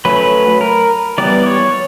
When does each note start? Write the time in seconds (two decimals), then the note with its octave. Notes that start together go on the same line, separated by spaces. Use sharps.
0.05 F#3 A3 C#4 B4
0.61 A#4
1.18 E3 G3 B3 D5
1.46 C#5